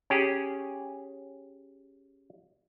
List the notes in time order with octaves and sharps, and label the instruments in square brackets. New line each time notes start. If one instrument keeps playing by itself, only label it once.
[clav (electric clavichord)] C#4 G4 G#4